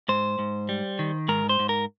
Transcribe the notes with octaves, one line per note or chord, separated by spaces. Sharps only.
G#2 C5
G#2
G3
D#3
G#2 A#4
C5
G#2
A#4